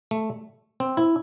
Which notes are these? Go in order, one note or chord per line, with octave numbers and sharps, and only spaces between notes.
A3
C4
E4